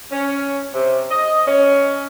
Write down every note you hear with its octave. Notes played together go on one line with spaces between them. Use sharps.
C#4
C3
D#5
C#4